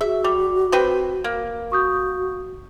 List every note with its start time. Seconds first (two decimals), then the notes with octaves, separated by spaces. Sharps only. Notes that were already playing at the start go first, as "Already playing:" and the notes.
0.01 F#4 G#4 E5
0.24 G3 D6
0.72 C4 B4 G5
1.24 A#3 A#4
1.72 F#4 C#6 D#6 G6